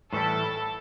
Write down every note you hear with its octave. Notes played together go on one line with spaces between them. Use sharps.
A2 E3 G3 E4 A4